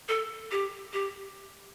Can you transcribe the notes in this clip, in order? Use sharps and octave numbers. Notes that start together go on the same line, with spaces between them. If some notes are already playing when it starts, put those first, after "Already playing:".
A4
G4
G4